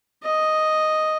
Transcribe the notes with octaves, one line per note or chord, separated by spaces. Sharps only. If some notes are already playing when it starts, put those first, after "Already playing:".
D#5